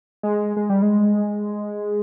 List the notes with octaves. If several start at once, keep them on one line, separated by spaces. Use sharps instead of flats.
G#3
G#3
G3
G#3